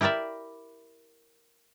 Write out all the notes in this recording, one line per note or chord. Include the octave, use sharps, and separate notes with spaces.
E4 G4 A#4 D5 E5